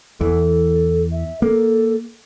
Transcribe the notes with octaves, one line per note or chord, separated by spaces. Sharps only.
E2 E3 A4
E5
A#3 A4